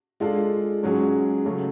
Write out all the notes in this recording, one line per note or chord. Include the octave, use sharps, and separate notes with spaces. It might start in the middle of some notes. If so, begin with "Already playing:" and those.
G#3 D4 F4 A4
G#2 F#3 C#4 G#4
C#3 F#3 A3